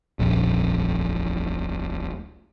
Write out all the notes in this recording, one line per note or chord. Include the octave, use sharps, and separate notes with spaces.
D#1 A#1 F2